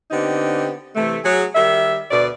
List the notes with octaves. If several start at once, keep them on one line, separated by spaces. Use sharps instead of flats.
D3 B3 C4 D#4 G4
C3 E3 A3
F#3 G#4
D#3 G3 E5
D2 B2 D5